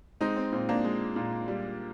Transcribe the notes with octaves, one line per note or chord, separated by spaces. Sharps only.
G#3 C4 D#4
C4
A#2 C4
A#3 D4
G#3
A#2
G3